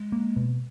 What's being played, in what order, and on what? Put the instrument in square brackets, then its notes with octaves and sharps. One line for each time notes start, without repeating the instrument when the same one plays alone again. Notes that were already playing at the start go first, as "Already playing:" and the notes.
Already playing: [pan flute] G#3
[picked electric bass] A#3
B2